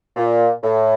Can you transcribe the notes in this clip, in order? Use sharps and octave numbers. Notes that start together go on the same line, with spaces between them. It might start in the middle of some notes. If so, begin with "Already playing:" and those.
A#2
A2